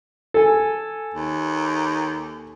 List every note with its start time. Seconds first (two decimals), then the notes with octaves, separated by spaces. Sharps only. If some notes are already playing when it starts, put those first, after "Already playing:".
0.34 A4 G#5
1.14 D#2